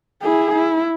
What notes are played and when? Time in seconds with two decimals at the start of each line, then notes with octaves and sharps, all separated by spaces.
0.22 E4 G#4
0.55 E4